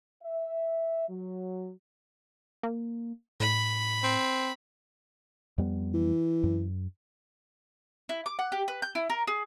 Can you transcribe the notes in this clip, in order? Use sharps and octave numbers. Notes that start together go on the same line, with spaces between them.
E5
F#3
A#3
A2 B5
C4
F2 G3 B3
E3
F#2
E4
D6
F#5
G4
B4
G6
E4
A#4
G#4